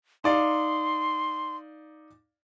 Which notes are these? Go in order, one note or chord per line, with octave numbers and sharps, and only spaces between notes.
D#4 D5 F5 C6